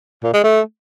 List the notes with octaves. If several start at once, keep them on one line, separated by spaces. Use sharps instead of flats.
A#2
G#3
A3